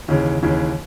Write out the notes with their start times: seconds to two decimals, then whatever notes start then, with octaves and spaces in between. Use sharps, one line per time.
0.08 D#2 C#3 E3
0.43 D#2 C#3 E3